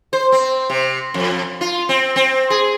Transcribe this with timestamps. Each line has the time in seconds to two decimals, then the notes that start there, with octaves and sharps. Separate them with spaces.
0.13 C5
0.32 C4
0.70 C3
1.14 F2
1.61 F4
1.89 C4
2.16 C4
2.50 G#4